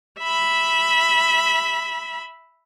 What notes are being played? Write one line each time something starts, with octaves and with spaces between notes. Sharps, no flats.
E5 B5